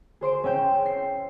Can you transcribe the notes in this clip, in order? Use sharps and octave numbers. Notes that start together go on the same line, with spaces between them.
G#4 C5 C6 D7
C#4 E5 G5 G6 E7
C7